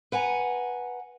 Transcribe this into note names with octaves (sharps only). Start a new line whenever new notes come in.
B4 F#5 G#5 A#5